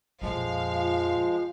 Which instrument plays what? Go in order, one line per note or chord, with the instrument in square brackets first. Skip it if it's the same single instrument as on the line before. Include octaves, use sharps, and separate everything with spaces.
[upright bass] F2 A#2 [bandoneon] F3 G#3 [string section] F5
[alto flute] F4